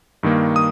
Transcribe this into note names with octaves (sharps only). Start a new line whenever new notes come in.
G2 D#3 A#3
D#6